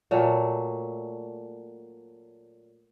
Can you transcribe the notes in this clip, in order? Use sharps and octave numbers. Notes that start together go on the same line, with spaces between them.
A#2 F#3 A3